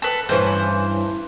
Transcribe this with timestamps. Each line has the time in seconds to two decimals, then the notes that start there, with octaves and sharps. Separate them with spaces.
0.02 A4 B4
0.29 G2 E3 C#4 C5